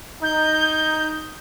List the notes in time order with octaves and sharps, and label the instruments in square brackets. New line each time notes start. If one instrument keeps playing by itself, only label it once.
[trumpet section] D#4 [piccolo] G6